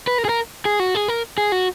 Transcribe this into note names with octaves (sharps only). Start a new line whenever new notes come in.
B4
A#4
G#4
A#4
G#4
F#4
G#4
A#4
G#4
F#4